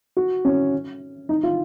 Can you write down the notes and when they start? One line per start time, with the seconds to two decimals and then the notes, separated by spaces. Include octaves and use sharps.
0.17 F#4
0.45 C#4
1.29 D#4
1.43 F4